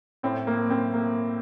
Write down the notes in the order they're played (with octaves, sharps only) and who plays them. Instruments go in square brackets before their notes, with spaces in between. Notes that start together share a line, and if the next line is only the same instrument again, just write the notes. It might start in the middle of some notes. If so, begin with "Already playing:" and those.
[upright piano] A2 C4
A#3
C4
A#3